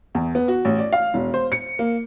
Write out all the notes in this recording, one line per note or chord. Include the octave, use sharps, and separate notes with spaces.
E2
B3
F#4
A1
D5
F5
E1
C5
C#7
A#3